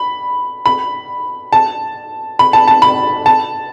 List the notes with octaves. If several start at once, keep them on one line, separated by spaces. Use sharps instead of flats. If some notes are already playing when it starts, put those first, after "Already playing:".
Already playing: B5
B5
A5
B5
A5
A5
B5
A5